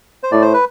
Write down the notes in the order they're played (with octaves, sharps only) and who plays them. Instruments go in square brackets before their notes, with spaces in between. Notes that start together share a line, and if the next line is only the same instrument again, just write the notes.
[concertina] C5
[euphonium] A2 [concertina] D5
[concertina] C5
B4